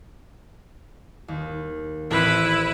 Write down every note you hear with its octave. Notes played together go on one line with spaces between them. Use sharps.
D#2
A1 C4 E4 B4 F#6